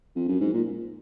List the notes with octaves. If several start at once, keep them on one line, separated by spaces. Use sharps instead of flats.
F2
F#2
G#2
A#2